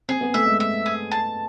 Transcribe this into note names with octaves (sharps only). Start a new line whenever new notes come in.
C4 G#4
B3
A3 E5
G#3
E5
G#4
A5